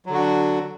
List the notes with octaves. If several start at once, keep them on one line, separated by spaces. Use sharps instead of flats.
D3 F#3 D4 F#4